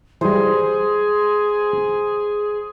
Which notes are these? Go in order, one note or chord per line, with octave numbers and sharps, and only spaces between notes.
E3 G3 G#4 C5